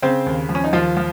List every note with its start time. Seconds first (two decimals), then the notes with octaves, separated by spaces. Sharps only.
0.02 C#3 C4 C5
0.26 D#2
0.49 F3
0.55 C#4
0.64 D#4
0.73 D#2 F3 F4
0.97 F3